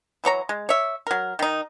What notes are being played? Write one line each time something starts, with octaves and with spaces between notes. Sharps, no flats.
E3 F#3 C#5 A#5
G#3
C#5 E5
F#3 A#4
D#3 D#4